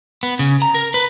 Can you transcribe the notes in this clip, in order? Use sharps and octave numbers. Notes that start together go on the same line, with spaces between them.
B3
C#3
A#5
A#4
B4